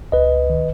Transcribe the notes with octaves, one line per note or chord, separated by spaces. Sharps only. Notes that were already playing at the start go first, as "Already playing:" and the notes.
C#2 B4 D#5
D#3